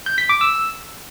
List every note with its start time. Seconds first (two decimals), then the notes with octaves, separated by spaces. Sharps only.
0.06 G6
0.18 B6
0.29 D6
0.41 E6